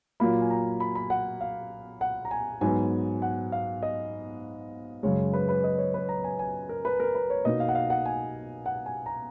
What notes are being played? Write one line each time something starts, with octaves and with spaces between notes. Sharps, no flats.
A#2 F#3 A#3 F4 B5
G#5
A#5
B5
B5
F#5
F5
F#5
A#5
G#5
G#2 F#3 B3 G#5
F#5
F5
D#5
F#2 C#3 G#3 C#5
B4
B4
D#5
C#5
B4
A#5
G#5
G#5
A#4
B4
A#4
B4
C#5
B2 A#3 D#4 D#5
F5
F#5
F5
F#5
G#5
F#5
G#5
A#5